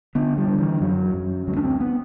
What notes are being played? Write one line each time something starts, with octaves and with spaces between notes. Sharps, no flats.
D3 B3
G3
D3
E3
F#2 F#3
F#2
D2 F#3
D4
C4
B3